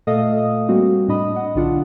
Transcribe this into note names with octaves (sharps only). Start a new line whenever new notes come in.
A#2 A3 A4 D#5 F5 D#6
G3 A#3 C4 F#4
A2 D4 D#5 B5 D#6
D#5 F#5
B1 D3 D4 F4 F#5